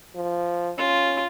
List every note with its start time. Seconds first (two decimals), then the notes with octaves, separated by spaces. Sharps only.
0.16 F3
0.78 C#4 F4